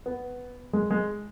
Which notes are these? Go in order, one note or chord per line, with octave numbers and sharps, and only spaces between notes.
B3
G#3
G#3